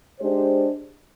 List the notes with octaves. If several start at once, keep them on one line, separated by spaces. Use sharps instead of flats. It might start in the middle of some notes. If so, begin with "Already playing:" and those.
G#3 D4 G4 C5